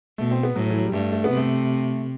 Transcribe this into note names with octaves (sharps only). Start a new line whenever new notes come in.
B2 A3
C4
B3
A2 F#3
E3
F#3
G3
G2 A3
A3
B3
C3
A3